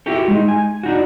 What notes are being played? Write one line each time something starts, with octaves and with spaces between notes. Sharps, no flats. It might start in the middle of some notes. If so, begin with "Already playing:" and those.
E4 F#4 G4 A4
G#3 D#4
G#5
D4 D#4 F#4